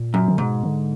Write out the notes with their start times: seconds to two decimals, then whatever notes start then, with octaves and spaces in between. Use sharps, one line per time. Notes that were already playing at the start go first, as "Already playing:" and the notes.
Already playing: A#2
0.14 F#2
0.28 D3
0.38 G#2 B2
0.63 D3